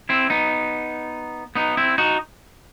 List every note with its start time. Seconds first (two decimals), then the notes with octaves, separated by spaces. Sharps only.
0.09 C4 E4
0.30 B3 D#4
1.55 B3 D#4
1.77 C4 E4
1.98 D#4 F#4